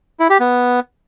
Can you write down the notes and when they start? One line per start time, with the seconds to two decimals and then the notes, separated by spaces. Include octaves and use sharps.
0.20 E4
0.30 G4
0.40 B3